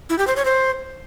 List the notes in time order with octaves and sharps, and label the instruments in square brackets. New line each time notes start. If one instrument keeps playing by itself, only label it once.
[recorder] E4
G4
C5
C#5
C5